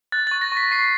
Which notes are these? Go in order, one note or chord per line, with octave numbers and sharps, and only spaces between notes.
F#6 A6
A6
C#6
A#6
C#6 B6
C#6 C7